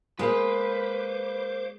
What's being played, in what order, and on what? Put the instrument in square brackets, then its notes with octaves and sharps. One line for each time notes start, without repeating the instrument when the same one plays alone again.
[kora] G#3 [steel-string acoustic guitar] A#3 [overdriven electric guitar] B4 [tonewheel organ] C5 D6